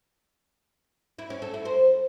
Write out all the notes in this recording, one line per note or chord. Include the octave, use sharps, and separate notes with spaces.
E4
C#4
A4
E4
C5